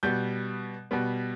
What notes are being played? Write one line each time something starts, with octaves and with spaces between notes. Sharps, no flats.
B2 G3 B3 G6
B2 G3 B3